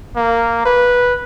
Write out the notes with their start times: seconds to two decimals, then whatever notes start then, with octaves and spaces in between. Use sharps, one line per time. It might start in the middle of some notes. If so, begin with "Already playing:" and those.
0.16 A#3
0.66 B4